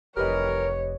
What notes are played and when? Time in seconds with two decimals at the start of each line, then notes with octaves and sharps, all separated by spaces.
0.17 F1 E3 G3 G4 A#4 B4 C#5 D#5